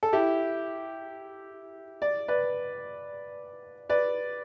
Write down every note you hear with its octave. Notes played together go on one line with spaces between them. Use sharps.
A4
E4 G4
D5
B4 D5
B4 D5